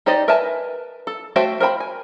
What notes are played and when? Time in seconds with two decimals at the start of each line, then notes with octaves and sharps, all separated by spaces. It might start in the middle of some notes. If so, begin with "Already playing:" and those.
0.06 D#4 G4 C5 D5 D#5
0.28 A#4 B4 E5 G#5 A5
1.07 A4
1.36 A3 F#4 C5 E5 G5
1.60 A#4 C5 G5 B5
1.80 G#5